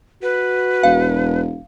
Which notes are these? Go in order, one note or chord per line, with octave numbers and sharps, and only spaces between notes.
F#4 B4
E1 F5